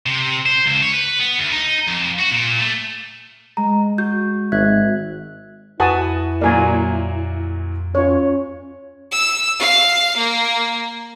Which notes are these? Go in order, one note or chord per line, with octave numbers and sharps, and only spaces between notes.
C3
C5
C#2
C#5
B4
B3
D2
D#4
F2
F#4
A#2
A3
G#3 A#5
F#4 G6
G#1 E5 F#6 G#6
F2 E4 F#4 B4 F#5 G#5 A5 D#6
A#2 F#3 A#3 D5 G#5
C#4 F4 C#5
E6
F5
A#3